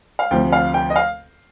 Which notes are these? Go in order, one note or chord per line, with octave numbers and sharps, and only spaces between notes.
F5
D2 C3 F3 G5
F5
G5
D#5
F5